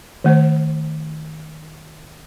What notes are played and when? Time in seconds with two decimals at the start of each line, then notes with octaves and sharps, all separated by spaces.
0.24 D#3 A3 C5